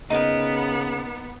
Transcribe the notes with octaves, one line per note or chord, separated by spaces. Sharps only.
C#3 B3 D#4 A#4